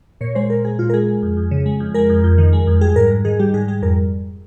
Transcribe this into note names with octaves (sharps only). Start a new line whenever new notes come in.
A#2 C#5
G#3 C5
A#2 A#4
G#3 G#4
A#2 F4
A#4
G#3 G#4
G#3
F2
F2
C#3
G#3
F2
G#3 A#4
F2
F2
D#3
G#3
F2
G3 G#4
G#2 A#4
G#2
D#3 G#4
G3 G4
G#2 G#4
G3 G#4
F2 A#4